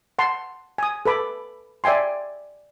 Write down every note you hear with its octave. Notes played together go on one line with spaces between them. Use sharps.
F#5 A5 C6
G#5 D#6
A4 B4 B5 D6
D5 E5 G5 G#5 C6